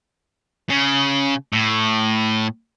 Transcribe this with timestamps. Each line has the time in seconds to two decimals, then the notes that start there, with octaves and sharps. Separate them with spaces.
0.70 C#3
1.53 A2